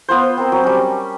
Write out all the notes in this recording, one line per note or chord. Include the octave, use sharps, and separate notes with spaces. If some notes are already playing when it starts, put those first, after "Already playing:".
B3 F4 C5
C4 A#4
F#3
G3 C#4